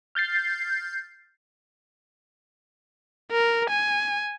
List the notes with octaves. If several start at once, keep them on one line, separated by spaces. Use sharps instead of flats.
F6 G6 A6 C7
A#4
G#5